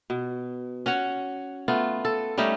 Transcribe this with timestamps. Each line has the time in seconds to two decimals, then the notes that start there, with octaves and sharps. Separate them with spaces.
0.10 B2
0.86 C#4 F#4 C#5
1.68 A3 B3 F4
2.05 A4
2.38 G3 A3 C#4 D#4